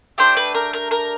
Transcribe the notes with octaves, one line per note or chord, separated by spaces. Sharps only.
A3 D4 G4 C5
B4
A#4
A#4
A#4